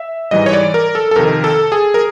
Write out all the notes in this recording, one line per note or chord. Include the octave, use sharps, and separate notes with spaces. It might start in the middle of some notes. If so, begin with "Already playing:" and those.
Already playing: E5
G#2 E3 G3 D#5
C#5
D5
A#4
A4
A4
F2 C3 D#3 A#4
A4
G#4
A#4